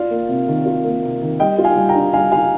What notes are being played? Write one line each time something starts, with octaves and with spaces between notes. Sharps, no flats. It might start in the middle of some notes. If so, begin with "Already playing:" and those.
Already playing: F4 D5 F5
A#3
C3
D#3
F4
A#3
C3
D#3
G3 D#5 G5
F4
F5 G#5
G3
G5 A#5
D4
G3 F5 G#5
F4 F5 G#5